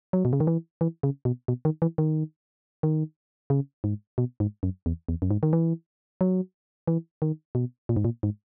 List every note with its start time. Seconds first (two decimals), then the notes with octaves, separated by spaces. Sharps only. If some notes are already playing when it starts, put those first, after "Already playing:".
0.13 F#3
0.25 B2
0.33 C#3
0.40 D#3
0.47 E3
0.81 E3
1.03 C#3
1.25 B2
1.48 B2
1.65 D#3
1.82 E3
1.98 D#3
2.83 D#3
3.50 C#3
3.84 G#2
4.18 B2
4.40 G#2
4.63 F#2
4.86 E2
5.09 E2
5.22 F#2
5.31 G#2
5.43 D#3
5.53 E3
6.21 F#3
6.88 E3
7.22 D#3
7.55 B2
7.89 A#2
7.96 G#2
8.05 A#2
8.23 G#2